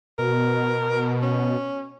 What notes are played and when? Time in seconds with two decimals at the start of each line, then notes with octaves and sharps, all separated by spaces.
0.19 B2 A#4
1.23 C#4